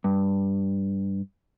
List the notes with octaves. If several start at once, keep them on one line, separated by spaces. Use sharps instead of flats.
G2